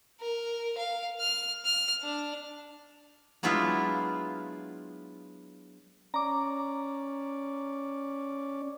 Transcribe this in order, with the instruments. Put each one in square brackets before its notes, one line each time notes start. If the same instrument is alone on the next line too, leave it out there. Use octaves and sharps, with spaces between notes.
[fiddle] A#4
F5
F6
F6
D4
[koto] F#3 G#3 B3 D4 E4 F4
[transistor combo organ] C#4 D5 [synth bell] A#5 D6